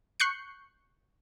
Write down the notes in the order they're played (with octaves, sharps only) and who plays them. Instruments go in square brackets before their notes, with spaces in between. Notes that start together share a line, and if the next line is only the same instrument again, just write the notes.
[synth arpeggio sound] C#6 F#6 G6 C7 C#7